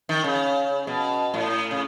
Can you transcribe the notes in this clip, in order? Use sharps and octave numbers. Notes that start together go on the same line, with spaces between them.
D#3
C#3
B2
A2
C#3